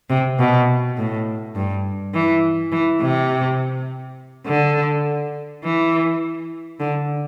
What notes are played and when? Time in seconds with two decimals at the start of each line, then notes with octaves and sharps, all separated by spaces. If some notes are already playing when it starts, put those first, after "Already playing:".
0.10 C3
0.39 B2
0.97 A2
1.55 G2
2.14 E3
2.72 E3
3.01 C3
4.47 D3
5.64 E3
6.80 D3